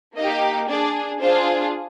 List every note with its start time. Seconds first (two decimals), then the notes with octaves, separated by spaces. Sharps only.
0.16 A#3 D#4 G4 D#5
0.69 D4 G#4 D5
1.21 D4 F4 G#4 C5